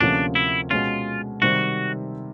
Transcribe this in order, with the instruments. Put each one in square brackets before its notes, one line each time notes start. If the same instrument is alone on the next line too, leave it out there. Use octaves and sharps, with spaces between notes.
[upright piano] D2 C3 F3 A#3 C#4 [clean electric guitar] D4
[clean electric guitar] E4
[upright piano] B2 G#3 C#4 [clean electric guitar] F4
[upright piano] C3 D#3 G3 C4 [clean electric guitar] F#4